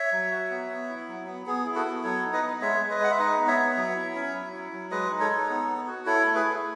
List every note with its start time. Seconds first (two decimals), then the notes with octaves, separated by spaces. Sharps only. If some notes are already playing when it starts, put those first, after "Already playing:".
Already playing: C#5 E5
0.12 F#3
0.31 F#4
0.51 B3
0.70 B3
0.89 E4
1.08 F#3
1.27 B3
1.46 B3 G#4
1.65 E4
1.75 F#4 A4
1.85 B3
2.04 F#3 A4 C#5
2.23 D#4
2.33 B4 D#5
2.43 B3
2.61 G#3 C#5 E5
2.80 G#3
2.90 B4 D#5
3.00 G#3 F#5
3.11 E5
3.19 D#4 B4 D#5
3.38 B3
3.47 C#5 E5
3.58 B3
3.77 F#3
3.96 E4
4.15 C#4
4.34 F#3
4.53 E4
4.72 F#3
4.91 G#3 B4 D#5
5.11 D#4
5.20 A4 C#5
5.30 D#4
5.50 B3
5.68 B3
5.87 F#4
6.06 E4 A4 C#5
6.25 A3
6.35 G#4 B4
6.45 A3